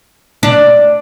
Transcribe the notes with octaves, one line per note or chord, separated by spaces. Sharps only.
D4